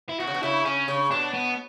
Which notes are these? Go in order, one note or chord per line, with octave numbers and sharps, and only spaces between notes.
E4
B2 F#4
C#3
B2
C#3 E4
C#3 C#4
C#3
B2 D4
B3